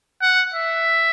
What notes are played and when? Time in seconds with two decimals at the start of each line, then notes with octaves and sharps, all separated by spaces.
0.22 F#5
0.54 E5